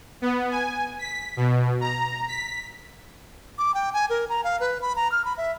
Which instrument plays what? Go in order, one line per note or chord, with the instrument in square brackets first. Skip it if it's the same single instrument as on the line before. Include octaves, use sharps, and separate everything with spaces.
[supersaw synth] B3
G#5
B6
B2
A#5
B6
[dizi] D6
G5
G#5
A#4
A#5
F5
B4
B5
A#5
F6
B5
E5